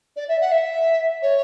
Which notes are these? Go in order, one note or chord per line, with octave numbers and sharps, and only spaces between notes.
D5
E5
F#5
E5
C#5